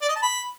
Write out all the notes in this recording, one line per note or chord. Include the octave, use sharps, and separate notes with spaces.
D5
D#5
A5
B5